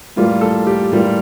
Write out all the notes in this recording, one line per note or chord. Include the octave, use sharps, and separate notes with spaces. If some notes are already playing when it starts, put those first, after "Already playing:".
A2 E3 G3 A#3 F4
A4
G4
A2 E3 G3 A#3 F4